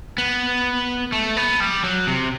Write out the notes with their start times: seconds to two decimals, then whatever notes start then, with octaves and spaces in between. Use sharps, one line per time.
0.18 B3
1.12 A3
1.37 B3
1.60 G3
1.84 F#3
2.07 C3